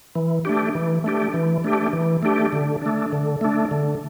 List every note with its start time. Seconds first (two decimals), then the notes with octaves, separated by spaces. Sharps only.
0.15 E3
0.45 A3 D4 G4
0.75 E3
1.04 A3 D4 G4
1.34 E3
1.64 A3 D4 G4
1.93 E3
2.23 A3 D4 G4
2.52 D3
2.82 A3 D4
3.12 D3
3.41 A3 D4
3.71 D3